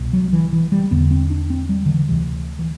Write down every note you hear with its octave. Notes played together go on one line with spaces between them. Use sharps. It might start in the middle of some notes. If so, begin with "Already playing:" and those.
Already playing: C2 B2
F#3
E3
E3
G3
E2 D3 B3
C4
D4
C4
G3
D3
E3
D2 C3 E3
E3